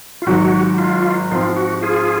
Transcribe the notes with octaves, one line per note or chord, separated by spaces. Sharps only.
F4
G#1 G#2 F#3 F#4
F4
G#2 F3 C4 F4
F#4
F4 G#4